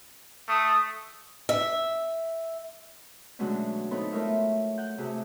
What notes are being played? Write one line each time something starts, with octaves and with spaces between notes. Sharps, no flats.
A3 D#6
E5
B2 D3 F#3 G#3 A3 C#4
B3 C4 D#4 A4 B4 C#5
A3 F4 A#4 C#5 E5
F#5 G6
C3 A3 F#4 G#4